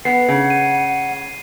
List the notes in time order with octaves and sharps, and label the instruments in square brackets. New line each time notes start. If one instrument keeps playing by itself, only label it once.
[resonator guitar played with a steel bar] B3 [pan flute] F#5 [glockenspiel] C7
[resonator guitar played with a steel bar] C#3
[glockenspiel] D#7